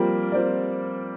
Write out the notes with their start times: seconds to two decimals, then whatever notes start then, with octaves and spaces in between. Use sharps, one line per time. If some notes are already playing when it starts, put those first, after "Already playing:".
Already playing: F3 G3 A#3 C4 F4 A#4
0.32 F3 C4 F4 A#4 D5